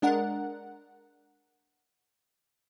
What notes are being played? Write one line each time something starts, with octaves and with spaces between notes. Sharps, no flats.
G#3 D4 A#4 F#5